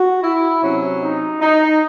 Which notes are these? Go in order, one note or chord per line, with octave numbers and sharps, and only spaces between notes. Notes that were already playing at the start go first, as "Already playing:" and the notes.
Already playing: F#4
E4
C3 F#3 C#4
D#4
D#4